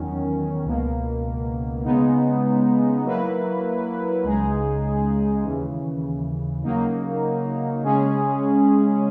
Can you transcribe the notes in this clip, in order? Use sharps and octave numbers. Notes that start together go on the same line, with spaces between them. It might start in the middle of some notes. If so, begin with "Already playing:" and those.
Already playing: E2 D#3 F#3 C#4
C#2 B2 A#3
C#3 G#3 B3 D#4
F#3 A#3 E4 B4
C#2 C#3 G#3 D#4 G#4
D#2 C#3 E3
C#3 F#3 A#3 D#4
C#3 G#3 C#4 G#4